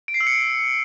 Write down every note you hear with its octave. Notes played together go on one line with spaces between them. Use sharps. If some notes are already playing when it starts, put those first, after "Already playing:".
D7
C7
E6
C#7